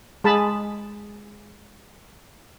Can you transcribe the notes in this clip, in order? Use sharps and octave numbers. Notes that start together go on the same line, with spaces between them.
G#3 G#4 A5 B5